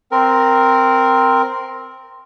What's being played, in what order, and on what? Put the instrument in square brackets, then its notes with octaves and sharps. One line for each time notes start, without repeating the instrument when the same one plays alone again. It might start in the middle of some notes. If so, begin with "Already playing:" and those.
[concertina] C4 A#4